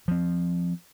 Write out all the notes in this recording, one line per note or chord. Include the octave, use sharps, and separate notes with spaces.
F3 C4